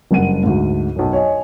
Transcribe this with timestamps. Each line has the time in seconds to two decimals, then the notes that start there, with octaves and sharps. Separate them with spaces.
0.11 F#1 G2 F#5 D#7
0.43 D2 G#2
0.96 B1 F#2
1.13 C#5 D#5 G#5